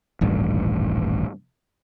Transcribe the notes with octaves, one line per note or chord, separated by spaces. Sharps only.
D#1 A1 G2